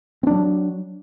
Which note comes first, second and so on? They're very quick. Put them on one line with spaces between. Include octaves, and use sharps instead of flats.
C4 D4 F#3